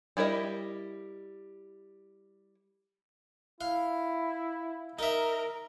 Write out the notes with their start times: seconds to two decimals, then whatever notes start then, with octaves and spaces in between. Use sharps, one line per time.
0.17 G3 E4 A#4 D5 D#5
3.61 E4 F5
4.99 D#4 A#4 E5